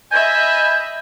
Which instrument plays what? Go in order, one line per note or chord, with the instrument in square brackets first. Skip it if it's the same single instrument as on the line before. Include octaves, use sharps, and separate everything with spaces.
[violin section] D#5 E5 B5 [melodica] G#5 [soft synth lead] G6